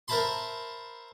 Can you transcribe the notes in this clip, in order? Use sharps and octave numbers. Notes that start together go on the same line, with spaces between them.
A#4 C5 E5 A5 B5 C6